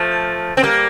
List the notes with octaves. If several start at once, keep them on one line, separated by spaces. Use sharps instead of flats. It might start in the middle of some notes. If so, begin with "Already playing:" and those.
Already playing: F3 A3
C4
G3 A#3